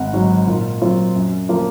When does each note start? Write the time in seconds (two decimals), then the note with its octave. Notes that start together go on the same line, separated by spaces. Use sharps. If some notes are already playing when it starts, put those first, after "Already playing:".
Already playing: G#1 F#5
0.13 G#2 F#3
0.47 A#2
0.81 F#3 C4 F4
1.15 F#2
1.49 F3 A#3 F4